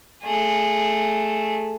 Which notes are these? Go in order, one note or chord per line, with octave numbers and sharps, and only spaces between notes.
A3 G#4